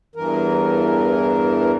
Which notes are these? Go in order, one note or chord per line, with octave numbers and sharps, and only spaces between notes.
E2 G2 E3 A#4